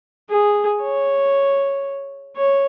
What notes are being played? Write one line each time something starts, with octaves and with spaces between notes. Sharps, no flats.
G#4
C#5
C#5